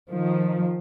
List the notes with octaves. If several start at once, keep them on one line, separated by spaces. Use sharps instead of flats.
D#3 F3